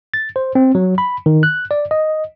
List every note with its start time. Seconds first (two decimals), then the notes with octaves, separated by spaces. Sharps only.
0.14 A6
0.36 C5
0.55 C4
0.75 F#3
0.98 B5
1.26 D#3
1.43 F#6
1.71 D5
1.91 D#5